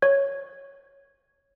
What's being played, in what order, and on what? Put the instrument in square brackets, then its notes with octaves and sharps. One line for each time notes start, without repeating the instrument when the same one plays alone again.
[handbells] C#5 G#6